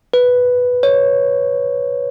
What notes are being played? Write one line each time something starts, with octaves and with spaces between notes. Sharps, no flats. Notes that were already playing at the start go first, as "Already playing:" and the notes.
B4
C#5